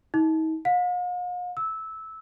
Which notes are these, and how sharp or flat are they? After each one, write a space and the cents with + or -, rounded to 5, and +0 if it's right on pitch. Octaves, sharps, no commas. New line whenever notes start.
D#4 +40
F5 +45
E6 -15